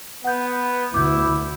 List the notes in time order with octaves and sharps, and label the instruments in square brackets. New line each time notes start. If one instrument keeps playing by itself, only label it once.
[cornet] B3 [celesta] F#5 G6
[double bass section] D2 [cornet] E4 [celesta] D6 G6